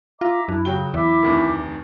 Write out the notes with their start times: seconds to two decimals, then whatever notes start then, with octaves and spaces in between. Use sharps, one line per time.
0.21 F4 E5 A#5 D6
0.48 F#2 D4 E4
0.65 C#3 F#3 F#4 G5 G7
0.94 E2 E4 E5 D6
1.22 F1 D2 D#3